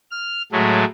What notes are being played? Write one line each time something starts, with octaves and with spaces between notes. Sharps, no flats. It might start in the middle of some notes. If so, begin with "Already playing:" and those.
F6
A2 F#3 G#3 A3